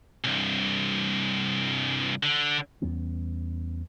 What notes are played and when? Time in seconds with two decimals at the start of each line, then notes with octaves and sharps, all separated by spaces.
0.24 C2 G2
2.23 D3
2.82 E2 G3 B3 C#4